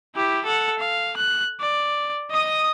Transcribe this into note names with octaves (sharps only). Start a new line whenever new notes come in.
E4 G4
A4 F#5
F5
F#6
D5
D#5 D#6